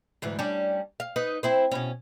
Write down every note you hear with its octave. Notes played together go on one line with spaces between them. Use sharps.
D2 G#2 E3
G3 C#4 D4
F5
D#4 B4
C4 E4 C5
B2 C#4